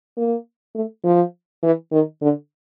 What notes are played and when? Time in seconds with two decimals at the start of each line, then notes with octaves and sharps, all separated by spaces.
0.17 A#3
0.75 A3
1.04 F3
1.63 E3
1.92 D#3
2.22 D3